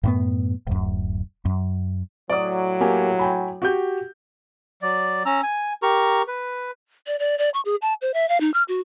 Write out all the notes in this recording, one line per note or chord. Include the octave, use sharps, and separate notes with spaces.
F#2 A2 B3
D1 F#2
F#2
A2 F#3 D5 D#6
A#3 G4 G#5
G5 G#5 B5
F#4 G4 G6
F#3 D5
C#4 A#5 E6
G#5
G4 A#4 A#5 C#6
B4
D5
D5
D5
C#6
G#4
A5
C5
E5
F5
D#4
F6
F#4